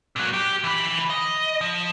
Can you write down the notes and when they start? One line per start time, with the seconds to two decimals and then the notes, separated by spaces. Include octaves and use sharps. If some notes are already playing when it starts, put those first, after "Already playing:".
0.16 A#2 F#3
0.34 G4
0.64 E3 B5
1.10 D#5
1.61 F3